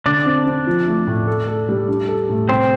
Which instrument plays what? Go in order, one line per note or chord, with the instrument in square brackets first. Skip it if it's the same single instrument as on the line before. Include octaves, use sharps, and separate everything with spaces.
[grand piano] D3 [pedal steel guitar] D4 D5
[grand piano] C4
C4
F3
A3
A2
A4
A4
G3
D4
A4
A2
[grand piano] C3 [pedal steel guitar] C4 C5